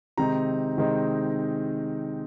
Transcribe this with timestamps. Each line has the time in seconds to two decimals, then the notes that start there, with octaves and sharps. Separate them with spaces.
0.17 C3 D#3 G#3 C4 D#4 A#5
0.78 C3 D#3 G#3 C4 D#4